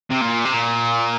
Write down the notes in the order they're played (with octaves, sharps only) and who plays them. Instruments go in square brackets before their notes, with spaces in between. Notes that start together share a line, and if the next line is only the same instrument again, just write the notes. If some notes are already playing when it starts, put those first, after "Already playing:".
[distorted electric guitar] C3
A#2
C3
A#2